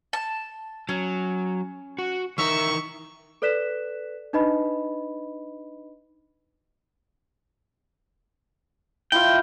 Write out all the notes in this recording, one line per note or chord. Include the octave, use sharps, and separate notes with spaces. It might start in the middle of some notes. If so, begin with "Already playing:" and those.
A5
F#3 C#4
F#4
E3 D#4 A#4 E5 C#6
A4 B4 D5 F#6 B6 E7
D4 D#4 B4 D#5 B5
E4 F4 F5 G5